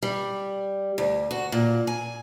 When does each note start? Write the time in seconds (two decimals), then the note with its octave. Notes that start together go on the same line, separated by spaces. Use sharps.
0.03 G3
0.98 D2
1.31 F#4
1.52 A#2
1.87 G#5